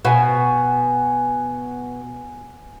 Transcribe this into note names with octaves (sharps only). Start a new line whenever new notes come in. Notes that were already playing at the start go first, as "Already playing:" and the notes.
B2 F#5 G#5